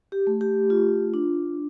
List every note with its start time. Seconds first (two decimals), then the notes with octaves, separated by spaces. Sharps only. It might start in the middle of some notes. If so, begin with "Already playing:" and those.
0.12 G4
0.27 A3
0.41 G4
0.70 F4
1.14 D4